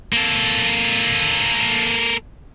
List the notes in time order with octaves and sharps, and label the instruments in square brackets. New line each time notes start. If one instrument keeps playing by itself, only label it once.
[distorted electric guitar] A#3 A4